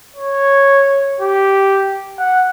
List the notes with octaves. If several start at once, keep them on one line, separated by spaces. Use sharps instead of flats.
C#5
G4
F#5